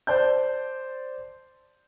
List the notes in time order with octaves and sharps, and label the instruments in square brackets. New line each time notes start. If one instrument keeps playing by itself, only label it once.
[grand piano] C5 D5 A5 G6